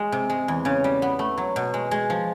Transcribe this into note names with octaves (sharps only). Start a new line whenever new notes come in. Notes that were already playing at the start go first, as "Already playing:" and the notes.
Already playing: G#3
C3
G#3
E2
C#3
G3
B3
A3
F#3
B2
G#3
G#3
F3